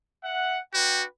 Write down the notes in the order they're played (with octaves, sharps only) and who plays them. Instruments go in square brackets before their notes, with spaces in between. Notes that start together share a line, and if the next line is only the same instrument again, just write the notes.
[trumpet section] E5 F#5
[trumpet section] D4 B4 G5 [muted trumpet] F#4